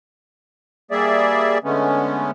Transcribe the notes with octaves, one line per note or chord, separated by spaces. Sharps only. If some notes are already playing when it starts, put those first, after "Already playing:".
G3 A#3 G#4 D5 E5
D3 G#3 A3 B3 C#4